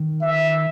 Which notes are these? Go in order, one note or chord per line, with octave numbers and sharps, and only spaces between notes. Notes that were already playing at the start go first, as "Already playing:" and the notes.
Already playing: D#3
E5